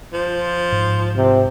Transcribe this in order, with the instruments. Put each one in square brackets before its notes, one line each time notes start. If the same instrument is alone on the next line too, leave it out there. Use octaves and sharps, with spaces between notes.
[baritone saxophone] F3
[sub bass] G#2
[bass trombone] C3